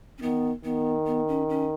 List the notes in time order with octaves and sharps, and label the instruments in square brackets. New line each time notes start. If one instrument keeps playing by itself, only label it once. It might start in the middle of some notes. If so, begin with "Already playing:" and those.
[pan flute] C#4
[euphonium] D#3 [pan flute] B3
[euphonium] D#3 [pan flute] B3
[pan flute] B3
C#4
C#4